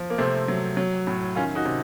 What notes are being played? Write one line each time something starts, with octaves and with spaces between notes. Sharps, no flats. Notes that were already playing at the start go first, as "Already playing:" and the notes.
Already playing: F3
A#3
C3 A3 C4
F#3
F#3
A2
D#3 C#4 F4
D#4 F#4
C3